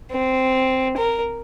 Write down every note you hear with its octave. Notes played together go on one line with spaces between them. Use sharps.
C4
A#4